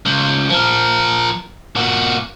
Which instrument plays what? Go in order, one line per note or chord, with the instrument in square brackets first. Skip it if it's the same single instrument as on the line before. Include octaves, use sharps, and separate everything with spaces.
[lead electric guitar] C#2
F3 A#4
A#2 F#4